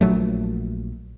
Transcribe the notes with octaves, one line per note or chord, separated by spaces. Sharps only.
A#1 F#3 A3